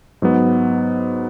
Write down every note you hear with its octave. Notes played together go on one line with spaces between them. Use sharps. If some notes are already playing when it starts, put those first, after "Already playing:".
G#2 F#3 B3